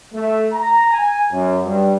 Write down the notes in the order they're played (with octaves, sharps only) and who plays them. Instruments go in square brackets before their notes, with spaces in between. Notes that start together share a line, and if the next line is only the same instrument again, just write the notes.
[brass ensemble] A3
A#5
G#5
F#2
G2